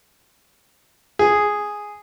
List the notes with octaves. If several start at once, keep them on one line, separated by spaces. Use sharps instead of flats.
G#4